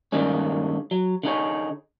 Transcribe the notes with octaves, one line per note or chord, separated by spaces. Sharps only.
G2 D3 D#3 G#3 A#3 C#4
F#3
D3 D#4 G#4 C#5